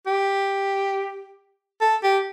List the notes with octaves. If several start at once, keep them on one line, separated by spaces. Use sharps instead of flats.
G4
A4
G4